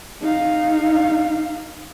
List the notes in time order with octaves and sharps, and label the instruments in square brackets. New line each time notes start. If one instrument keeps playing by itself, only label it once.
[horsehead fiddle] D#4 F5